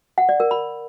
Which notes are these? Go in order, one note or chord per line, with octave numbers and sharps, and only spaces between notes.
F#5
D5
A#4
B5